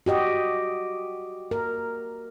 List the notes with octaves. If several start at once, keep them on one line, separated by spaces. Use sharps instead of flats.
F#4 G4 D#5
A#4